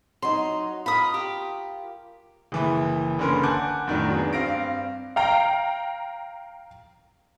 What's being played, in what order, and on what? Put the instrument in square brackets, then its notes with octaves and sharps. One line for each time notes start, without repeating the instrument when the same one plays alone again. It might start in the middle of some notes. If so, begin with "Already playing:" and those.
[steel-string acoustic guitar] F#3 D#4 [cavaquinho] C6
[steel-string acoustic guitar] F4 A#4 [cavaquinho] B5 D#6
[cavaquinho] G4
[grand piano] F#1 E3 B5
F#1 D3 C#4 A#4 B4 C6
F#5 G#5 A5 D6 F#6 G6
F2 A2 D#3 F#3 D4
F#3 B3 D4 G#4
G2 C4 F5 A#6 D7
[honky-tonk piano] F5 G5 A#5